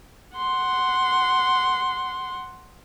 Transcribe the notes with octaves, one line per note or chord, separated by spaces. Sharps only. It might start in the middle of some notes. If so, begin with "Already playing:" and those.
F#5 C6